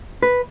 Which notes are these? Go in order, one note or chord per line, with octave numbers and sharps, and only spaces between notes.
B4